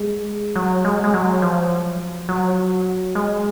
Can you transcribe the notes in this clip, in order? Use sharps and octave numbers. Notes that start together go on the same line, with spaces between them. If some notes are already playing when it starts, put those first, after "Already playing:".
Already playing: G#3
F#3
G#3
G#3
F#3
F3
F#3
G#3